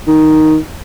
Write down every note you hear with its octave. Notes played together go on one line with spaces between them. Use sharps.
D#3